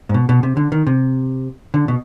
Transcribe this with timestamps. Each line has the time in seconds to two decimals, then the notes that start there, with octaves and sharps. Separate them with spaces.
0.09 G#2
0.14 B2
0.29 B2
0.43 C3
0.57 D3
0.72 D#3
0.87 C3
1.74 D3
1.88 B2